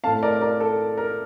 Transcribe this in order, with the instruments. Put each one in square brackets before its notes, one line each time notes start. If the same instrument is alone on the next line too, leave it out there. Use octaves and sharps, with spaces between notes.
[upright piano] A2 A3 C4 F5 A5
A#4 D5
A#4 D5
A4
A#4